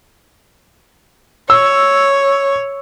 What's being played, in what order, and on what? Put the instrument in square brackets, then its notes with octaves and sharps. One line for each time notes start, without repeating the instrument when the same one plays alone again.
[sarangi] C#5 [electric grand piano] E6